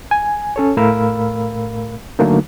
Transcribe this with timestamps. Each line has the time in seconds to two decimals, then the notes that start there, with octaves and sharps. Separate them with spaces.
0.11 G#5
0.56 C#4 A4 C#5
0.77 A2 A3 A#4 F5 B5 E6
2.19 D3 F#3 A3 A#3 D#4